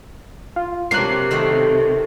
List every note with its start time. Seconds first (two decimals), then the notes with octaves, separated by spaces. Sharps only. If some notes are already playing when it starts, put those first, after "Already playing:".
0.56 F4
0.91 C3 F#3 A#3 D4 F#6 C7
1.31 D#3 A3 F#4